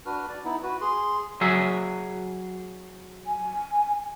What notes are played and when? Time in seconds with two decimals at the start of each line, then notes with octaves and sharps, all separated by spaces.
0.06 D4 F#4 B4 F6
0.29 D5
0.44 B3 D#4 E4
0.63 F#4 B4
0.81 G#4 C6
1.41 F#3 G#4 E5
3.27 G#5